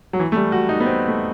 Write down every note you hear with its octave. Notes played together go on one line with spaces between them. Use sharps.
F#3
E3
A3
G3
F#4
D#4
B3
C4
A3